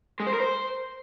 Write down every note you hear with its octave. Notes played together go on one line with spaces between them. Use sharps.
G#3
C5
A#4
C5